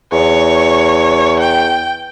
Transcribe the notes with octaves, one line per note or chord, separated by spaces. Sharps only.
E2 C#5
G5